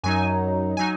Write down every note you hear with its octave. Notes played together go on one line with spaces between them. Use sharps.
F#2 F#3 D#4 G#5
F#3 D#4 G#5